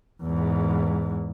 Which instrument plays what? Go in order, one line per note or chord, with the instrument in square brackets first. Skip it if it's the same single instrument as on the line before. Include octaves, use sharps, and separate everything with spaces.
[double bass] E2 G#2